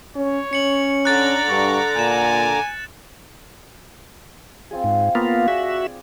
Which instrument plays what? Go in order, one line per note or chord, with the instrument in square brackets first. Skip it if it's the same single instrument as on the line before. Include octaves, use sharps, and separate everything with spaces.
[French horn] C#4 [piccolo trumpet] C#5
[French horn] C#4 [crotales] C#7 F#7
[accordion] D3 A#5 D6 [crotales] F#6 A6
[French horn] G2 [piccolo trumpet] C#6
[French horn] A#2 [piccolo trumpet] G#5 [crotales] F#6 E7
[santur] C4 F4 G#4
[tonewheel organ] G#2
[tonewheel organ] A#3 B3 F4 [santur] F5
[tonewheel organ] F#4 E5 [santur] G#4 D5